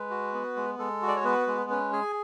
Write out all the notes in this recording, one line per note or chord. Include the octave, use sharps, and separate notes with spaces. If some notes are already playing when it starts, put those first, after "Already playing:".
Already playing: G#3 B4
F#4
B3
G#3
G#3 A4
F#4
D5
C#5
B3 B4
G#3
C#4 B4
G#4 G#5